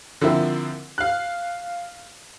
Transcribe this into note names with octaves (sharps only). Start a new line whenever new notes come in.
D3 F3 A#3 C4 E4
F5 F#6